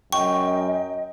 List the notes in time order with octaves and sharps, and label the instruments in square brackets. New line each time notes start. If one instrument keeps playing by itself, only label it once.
[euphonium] F#2 [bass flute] D#5 [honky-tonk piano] G5 [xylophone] C#6